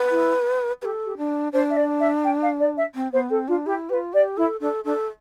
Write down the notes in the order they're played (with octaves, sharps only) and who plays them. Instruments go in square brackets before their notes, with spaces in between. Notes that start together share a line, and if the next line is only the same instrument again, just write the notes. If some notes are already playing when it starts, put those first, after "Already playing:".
Already playing: [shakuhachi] B4
[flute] E4
[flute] G4 [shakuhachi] B4
[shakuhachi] A4
[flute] G4
[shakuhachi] D4
[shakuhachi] D4 [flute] C5
[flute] E5
D5
E5
G5
F5
D5
E5
[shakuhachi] C4
[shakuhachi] B3 [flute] C5
[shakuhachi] C4 [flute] A4
[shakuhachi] D4 [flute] F4
[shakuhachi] E4 [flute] G4
[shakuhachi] G4 [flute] B4
[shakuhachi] F4
[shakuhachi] G4 [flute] D5
[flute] E4 [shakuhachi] A4
[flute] D4 [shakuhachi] A4
[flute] D4 [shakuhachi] A4